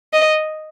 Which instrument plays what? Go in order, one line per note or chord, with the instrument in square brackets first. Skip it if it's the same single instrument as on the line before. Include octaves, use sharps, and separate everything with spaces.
[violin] D#5